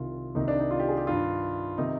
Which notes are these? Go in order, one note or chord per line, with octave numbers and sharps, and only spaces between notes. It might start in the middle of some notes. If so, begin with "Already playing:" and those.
Already playing: C2 C3 D#3 F4
C2 C3 D#3 D#4
D4
D#4
F4
G4
G#4
G4
G2 D#3 F4
C3 D#3 D#4